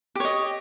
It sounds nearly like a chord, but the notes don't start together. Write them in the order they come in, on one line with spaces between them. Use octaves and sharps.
G4 C#5 D#5